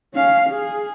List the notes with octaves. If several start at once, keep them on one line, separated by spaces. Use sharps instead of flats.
C#4 F5
G#4